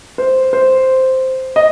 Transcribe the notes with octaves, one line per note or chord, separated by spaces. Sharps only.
C5
C5
D#5